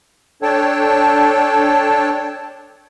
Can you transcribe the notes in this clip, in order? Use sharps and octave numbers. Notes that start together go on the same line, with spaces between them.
D4 A4 C#5 G5 A5